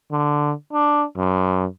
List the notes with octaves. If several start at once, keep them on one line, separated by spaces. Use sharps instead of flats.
D3
D4
F#2